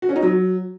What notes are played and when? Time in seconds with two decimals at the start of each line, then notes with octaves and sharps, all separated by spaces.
0.02 F#4
0.09 C#4
0.16 D#4
0.22 F#3